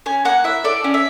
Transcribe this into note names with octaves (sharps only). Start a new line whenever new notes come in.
C#4 G#5
A#3 F#5
E4 E5
A4 D5
C#4
E5